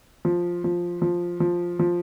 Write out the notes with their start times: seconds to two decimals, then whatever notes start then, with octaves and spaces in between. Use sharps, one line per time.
0.25 F3
0.64 F3
1.02 F3
1.40 F3
1.79 F3